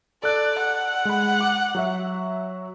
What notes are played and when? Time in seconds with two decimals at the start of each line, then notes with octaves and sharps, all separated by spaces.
0.24 A4 D5 F#6
0.59 F#5
1.05 G#3 B5
1.41 D6
1.75 F#3 F#4 E5